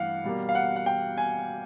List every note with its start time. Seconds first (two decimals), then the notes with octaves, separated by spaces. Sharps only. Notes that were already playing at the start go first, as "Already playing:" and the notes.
Already playing: G2 E3 A3 F5 F#5
0.24 B2 G3 A#3
0.49 F5
0.55 F#5
0.76 F#5
0.86 G5
1.18 G#5